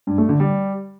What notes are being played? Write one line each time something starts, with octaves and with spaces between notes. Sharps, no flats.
G2
A3
D3
G3